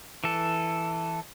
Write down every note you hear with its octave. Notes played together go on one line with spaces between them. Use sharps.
E3 A4